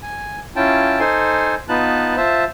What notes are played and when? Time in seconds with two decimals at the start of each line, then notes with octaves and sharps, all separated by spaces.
0.02 G#5
0.56 C#4 E4 F4 G5 A5
1.00 D#4 A4 C5 G#5 C6
1.69 B3 D#4 F4 B4 A5 F#6
2.17 F4 C5 E5 A5